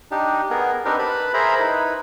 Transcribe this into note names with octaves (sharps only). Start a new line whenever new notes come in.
D4 D#4 G4
B3 G#4 A#4
C4 D4 D#4 G4 A#4 B4
B4 A5 B5
G#4 A#4 C5 E5 A#5 B5
D#4 E4 B4